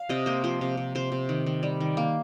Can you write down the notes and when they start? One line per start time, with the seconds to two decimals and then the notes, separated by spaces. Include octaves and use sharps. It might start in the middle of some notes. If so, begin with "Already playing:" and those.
Already playing: F5
0.09 C3 D#5
0.26 A#3 C5
0.44 F3 C5
0.61 C3
0.77 C3
0.95 C3 C5
1.12 C3
1.29 D#3
1.46 D#3
1.63 G3
1.80 D#3
1.97 A#3